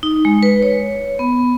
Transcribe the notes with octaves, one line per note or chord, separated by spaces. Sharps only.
D#4
G#3
B4
C#5
B3